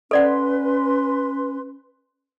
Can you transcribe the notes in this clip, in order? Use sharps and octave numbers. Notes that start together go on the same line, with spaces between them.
C#4 A4 B4 D5 F#5 C6